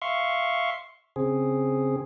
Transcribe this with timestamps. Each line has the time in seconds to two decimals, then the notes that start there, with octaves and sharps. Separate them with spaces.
0.02 E5 F5 C6 C#6
1.16 C#3 C4 G#4